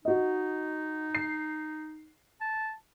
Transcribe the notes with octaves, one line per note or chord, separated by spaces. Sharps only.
D#4 F#4 D#5
C7
A5